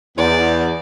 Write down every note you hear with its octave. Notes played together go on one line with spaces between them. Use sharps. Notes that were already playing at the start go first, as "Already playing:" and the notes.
E2 D5